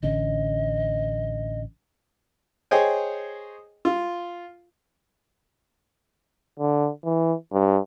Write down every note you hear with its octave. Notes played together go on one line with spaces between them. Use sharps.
A1 D3 C#4 D#5
G#4 C5 C#5 D#5 G5 G#5
F4
D3
E3
G2